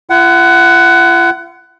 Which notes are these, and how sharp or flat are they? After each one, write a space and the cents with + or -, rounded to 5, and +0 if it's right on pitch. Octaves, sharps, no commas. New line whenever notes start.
F4 -45 F#5 +15